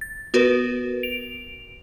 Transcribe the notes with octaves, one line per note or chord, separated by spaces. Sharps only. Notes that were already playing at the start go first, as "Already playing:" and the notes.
A6
B3 F#4 A#4 B4
D7 F7